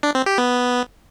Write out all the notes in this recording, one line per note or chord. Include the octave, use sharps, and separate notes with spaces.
D4
C4
G4
B3